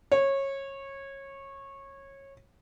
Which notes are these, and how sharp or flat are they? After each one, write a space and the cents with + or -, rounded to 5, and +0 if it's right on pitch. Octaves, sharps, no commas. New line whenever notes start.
C#5 -20